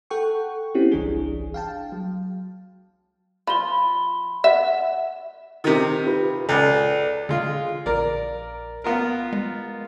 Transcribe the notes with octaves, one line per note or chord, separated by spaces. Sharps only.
A4 F#5 G5 C#6
C4 C#4 E4 G4
G1 C2 E3 D4 G#4
F5 G5 A5
F#3
F3 B5 C6 G7
E5 F#5
C3 D#3
F4 G4 B4
C#2 A4 D5
D3 G#3 F4
A#1 A#4 D5
B3 F4 A#4
G#3